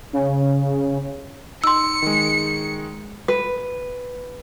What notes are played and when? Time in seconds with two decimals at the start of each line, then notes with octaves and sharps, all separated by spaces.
0.13 C#3
1.64 D#4 C6 E6 C#7
2.02 D#3 G#3
3.28 B4